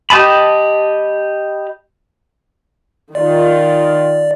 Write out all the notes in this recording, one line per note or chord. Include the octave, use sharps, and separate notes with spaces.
G4 D#5 A5 B5
D#3 F4 D5